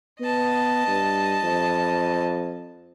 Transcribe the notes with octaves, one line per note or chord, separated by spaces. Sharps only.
B3 D#5 A5
G2
F2